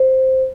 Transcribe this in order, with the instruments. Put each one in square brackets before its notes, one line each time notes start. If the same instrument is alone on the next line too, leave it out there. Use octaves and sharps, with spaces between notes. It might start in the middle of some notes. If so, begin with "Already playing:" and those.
Already playing: [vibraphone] C5